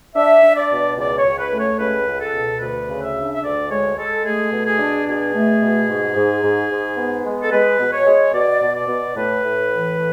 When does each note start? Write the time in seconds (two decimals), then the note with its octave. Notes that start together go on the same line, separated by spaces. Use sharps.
0.15 D4 E5
0.43 D4
0.56 D5
0.70 B2
0.97 C#2 D5
1.17 C#5
1.25 C#2
1.38 B4
1.53 A3
1.59 C#5
1.79 C#2 B4
2.07 C#2
2.20 A4
2.33 B2
2.61 D2 B4
2.89 C#3
3.02 E5
3.16 D4
3.33 E5
3.43 D2 D5
3.70 G#3 C#5
3.98 G#3 A4
4.24 A3 G#4
4.52 B2
4.65 G#4
4.79 D4
5.07 B2 G#4
5.34 A3
5.62 B2
5.89 G#2
6.16 G#2
6.43 G#2
6.71 G#2
6.97 B3
7.25 G#3
7.43 A4
7.52 G#3 B4
7.79 B2
7.93 C#5
8.07 G#3
8.34 B2 D5
8.62 B2
8.75 D5
8.88 B2
9.16 A2 B4
9.44 A2
9.71 E3
9.97 A2